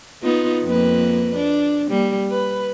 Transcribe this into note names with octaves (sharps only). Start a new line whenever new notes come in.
B3 D#4 F4
F2 A#3 B4
D4
G3 A#3
B4